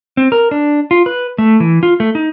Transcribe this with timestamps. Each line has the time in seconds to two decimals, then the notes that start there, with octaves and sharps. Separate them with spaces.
0.17 C4
0.32 A#4
0.51 D4
0.91 F4
1.06 B4
1.38 A3
1.60 E3
1.83 F4
2.00 A3
2.15 D#4